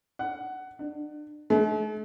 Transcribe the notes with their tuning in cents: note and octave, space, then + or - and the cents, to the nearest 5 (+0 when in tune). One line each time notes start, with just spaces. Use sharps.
F#5 +15
D4 +35
A3 -45